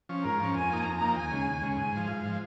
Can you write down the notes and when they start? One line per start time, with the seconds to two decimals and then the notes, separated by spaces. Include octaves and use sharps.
0.09 F3 C#4
0.24 G#2 A#4
0.40 F3 C#4
0.55 F2 G#5
0.70 F3 A#3 D#4
0.85 F2 A#5
1.01 F3 A#3 D#4
1.16 D#2 G#5
1.31 C#3 G#3
1.47 D#2
1.62 C#3 G#3
1.77 G#2 G#5
1.93 F3 G#3
2.07 G#2 F5
2.23 F3 G#3